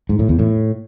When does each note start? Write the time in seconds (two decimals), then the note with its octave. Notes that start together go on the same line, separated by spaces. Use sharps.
0.09 G#2
0.19 A2
0.29 E2
0.39 A2